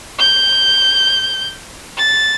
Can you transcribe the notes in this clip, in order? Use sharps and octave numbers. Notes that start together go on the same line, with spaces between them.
G6
A6